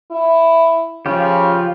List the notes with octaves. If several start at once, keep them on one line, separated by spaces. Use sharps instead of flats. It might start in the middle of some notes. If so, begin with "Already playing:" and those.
E4
C#3 F3 F4 G4